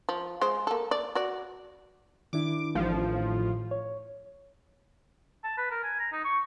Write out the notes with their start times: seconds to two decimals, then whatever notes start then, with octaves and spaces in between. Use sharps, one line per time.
0.09 F3
0.41 G#3 C5
0.67 A#3 A4
0.91 D5
1.15 F#4 D5
2.33 D#3 D4 E4 D6
2.75 A1 F3
3.71 C#5
5.44 A5
5.58 B4
5.71 A#4
5.83 G#5
5.99 A#5
6.12 D#4
6.24 C#6